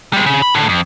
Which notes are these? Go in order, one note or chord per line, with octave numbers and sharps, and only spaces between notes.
G3 G#3
C#3
B5
A2 D3
F2